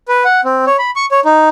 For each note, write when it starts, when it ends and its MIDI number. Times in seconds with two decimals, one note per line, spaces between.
0.08 0.24 71
0.25 0.41 78
0.45 0.65 60
0.67 0.77 73
0.79 0.90 83
0.96 1.06 85
1.11 1.20 73
1.25 1.49 63